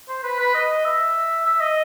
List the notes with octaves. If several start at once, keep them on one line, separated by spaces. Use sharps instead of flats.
C5
B4
B4
D#5
E5
E5
D#5